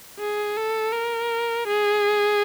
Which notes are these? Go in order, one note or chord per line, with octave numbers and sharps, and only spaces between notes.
G#4
A4
A#4
G#4